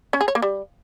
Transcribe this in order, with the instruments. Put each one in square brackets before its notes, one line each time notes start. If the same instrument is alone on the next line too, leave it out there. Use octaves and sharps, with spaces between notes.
[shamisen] C#4
G#4
C#5
A#3
G3